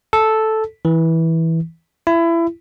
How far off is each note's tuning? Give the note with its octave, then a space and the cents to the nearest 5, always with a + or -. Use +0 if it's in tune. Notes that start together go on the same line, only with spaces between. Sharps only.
A4 -5
E3 -15
E4 +25